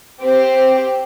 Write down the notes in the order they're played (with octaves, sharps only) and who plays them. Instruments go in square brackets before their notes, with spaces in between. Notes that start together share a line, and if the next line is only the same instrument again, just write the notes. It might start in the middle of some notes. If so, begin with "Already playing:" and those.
[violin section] C4 G4 C5